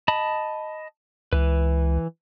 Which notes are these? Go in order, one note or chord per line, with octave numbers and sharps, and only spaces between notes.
D#5 A5 B5
C#2 E3 B4